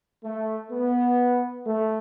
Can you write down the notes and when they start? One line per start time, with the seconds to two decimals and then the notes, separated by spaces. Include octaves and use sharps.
0.23 A3
0.71 B3
1.67 A3